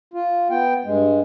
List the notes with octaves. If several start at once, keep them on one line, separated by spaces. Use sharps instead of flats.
F4
B3 G5
G2 G#3